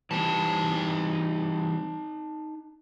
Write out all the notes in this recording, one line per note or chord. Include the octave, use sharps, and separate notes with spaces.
E3 G3 C4 D#4 A5